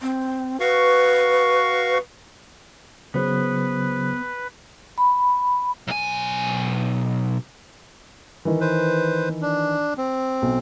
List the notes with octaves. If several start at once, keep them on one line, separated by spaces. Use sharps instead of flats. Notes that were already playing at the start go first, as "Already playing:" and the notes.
C4
F#4 B4 F5 C#6
C#3 F#3 B3 G#4 B4 C5
B5
B1 G#5
D#3 E3
B4 C5
D4
C4
B1